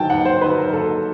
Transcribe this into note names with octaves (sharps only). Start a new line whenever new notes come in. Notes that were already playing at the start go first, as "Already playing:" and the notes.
Already playing: D#3 F#3 G5 A5
D#2 F#5
C5
D#3 F#3 B4
A#4
D#2 A4